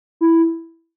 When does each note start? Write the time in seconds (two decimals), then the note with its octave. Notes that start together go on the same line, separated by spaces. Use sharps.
0.21 E4